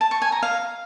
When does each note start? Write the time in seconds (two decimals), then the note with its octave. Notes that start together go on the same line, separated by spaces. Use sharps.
0.01 A5
0.11 C#6
0.22 G#5
0.32 A#5
0.43 F5